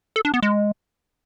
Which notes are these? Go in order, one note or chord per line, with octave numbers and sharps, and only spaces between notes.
A4
D4
B3
G#3